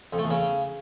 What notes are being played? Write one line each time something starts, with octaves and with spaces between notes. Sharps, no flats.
F2
A3
E2
C#3